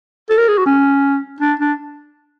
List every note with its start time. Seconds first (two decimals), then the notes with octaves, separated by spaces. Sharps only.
0.30 A4
0.38 A#4
0.48 G#4
0.58 F#4
0.66 C#4
1.40 D4
1.60 D4